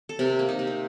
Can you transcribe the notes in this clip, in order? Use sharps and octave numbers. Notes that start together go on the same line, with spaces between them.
A4
C3 A#4
A#3
D#4
C3
C4